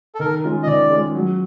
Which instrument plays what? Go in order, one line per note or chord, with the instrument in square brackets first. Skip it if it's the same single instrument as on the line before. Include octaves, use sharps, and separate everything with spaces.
[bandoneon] A4
[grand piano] D#3 [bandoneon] A#4
[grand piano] G#3 C#4 F4
[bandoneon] D#5
[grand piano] D#3 [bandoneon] D5
[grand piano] G#3 C#4 F4
F#3